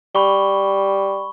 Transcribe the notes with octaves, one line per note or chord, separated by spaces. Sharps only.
G3 B5 C#6 G7